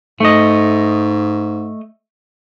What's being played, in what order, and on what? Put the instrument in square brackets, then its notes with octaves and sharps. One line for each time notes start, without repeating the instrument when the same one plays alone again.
[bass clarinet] G#2 [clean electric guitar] A3 D#5